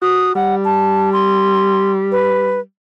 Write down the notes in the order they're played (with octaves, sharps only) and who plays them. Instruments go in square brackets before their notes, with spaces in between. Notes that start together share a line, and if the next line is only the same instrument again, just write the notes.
[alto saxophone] F#4 [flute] D#6
[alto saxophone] G3 [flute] F#5
[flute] A5
C6
B4